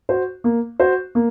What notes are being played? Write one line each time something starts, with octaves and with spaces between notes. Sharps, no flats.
F#4 C5
A#3
F#4 C5
A#3